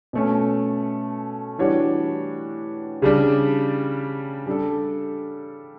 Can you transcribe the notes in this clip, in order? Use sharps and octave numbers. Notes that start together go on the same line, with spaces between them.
B2 A3 C#4
E3 G3 D4 F#4 C#5
C#3 G3 D4
G3 D4 A4